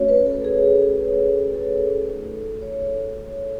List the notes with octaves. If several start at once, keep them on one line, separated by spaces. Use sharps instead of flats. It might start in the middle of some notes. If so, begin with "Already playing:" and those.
Already playing: A3 C#4 F#4 C#5
B4
A4
G#4
A4
A3 D#4 F#4
C#5